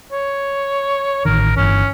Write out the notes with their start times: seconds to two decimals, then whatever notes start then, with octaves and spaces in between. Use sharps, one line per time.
0.12 C#5
1.25 A1 D#3 A#4
1.57 G1 E3 C#4